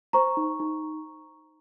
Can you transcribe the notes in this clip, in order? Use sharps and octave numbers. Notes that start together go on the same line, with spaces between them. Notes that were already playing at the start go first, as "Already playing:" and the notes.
C5 A#5 C#6
D#4
D#4